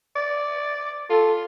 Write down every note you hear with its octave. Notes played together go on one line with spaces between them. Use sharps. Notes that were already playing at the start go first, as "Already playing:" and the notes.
D5
F4 A4